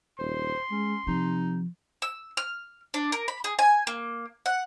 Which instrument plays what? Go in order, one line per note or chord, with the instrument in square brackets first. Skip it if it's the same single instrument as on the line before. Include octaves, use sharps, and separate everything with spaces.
[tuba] D#1 [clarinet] C5 [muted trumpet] C6
[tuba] G#3 [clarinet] C#4
[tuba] C3 [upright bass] F3 [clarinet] D#4
[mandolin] E6
F6
D4
A#4
B5
G#4
G#5
A#3
F#5